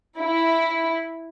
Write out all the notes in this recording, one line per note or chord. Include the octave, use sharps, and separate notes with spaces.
E4